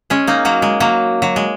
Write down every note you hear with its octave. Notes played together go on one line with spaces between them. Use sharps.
G#3 C#4
A#3 D#4
F#3 A#3
G#3
F#3 A#3
F#3
G#3